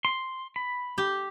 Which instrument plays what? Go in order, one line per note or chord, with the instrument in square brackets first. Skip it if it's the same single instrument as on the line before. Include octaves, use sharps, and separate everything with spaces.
[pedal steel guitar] C6
B5
[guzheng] G4